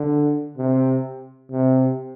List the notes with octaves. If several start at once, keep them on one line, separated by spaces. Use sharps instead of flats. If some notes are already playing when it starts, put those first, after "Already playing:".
Already playing: D3
C3
C3